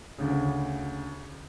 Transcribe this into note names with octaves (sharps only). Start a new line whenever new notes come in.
D2 C#3